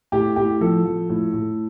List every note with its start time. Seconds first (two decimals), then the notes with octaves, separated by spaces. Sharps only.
0.12 A2 G4
0.36 A2 G4
0.61 F3 A4
0.85 F3
1.09 A2
1.33 A2